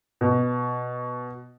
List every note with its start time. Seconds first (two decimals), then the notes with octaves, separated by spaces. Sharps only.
0.21 B2